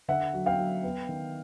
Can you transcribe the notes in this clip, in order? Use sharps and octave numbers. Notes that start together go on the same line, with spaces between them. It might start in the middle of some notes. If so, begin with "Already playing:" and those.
D3 E5 F#5
F#3
F5 G5
F#3
B3
D#3